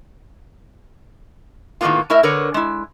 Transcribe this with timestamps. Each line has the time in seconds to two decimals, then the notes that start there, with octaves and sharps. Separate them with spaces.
1.81 A2 D#3 G3 A#3 B3 F4
2.10 A3 E4 A#4 D#5 E5
2.23 D3 A#4 B4 C#5
2.54 G#3 E4